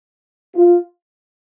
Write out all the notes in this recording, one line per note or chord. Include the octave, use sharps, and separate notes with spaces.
F4